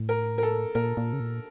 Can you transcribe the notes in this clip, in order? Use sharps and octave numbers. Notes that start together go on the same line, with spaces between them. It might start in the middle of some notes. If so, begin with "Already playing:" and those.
Already playing: A2
A#4
A#4
A4
A#2 A#4
A#2
C#3
A#2